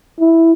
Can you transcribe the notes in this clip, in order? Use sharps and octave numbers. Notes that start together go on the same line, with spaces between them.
E4